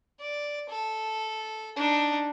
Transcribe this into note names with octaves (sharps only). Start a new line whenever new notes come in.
D5
A4
D4 D#4